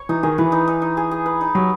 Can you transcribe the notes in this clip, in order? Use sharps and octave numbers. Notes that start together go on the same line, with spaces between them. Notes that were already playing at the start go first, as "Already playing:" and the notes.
Already playing: C#5
E3 D#4
D#3 G#4
E3 B4
D#4
D#4
D#4
G#4
G#4
B4
D#4
F#3 G4